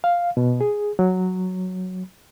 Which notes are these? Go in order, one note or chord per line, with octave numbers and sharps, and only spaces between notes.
F5
B2
G#4
F#3